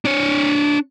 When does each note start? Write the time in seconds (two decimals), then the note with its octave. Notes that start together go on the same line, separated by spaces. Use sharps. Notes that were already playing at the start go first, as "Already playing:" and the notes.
0.05 D4 C#5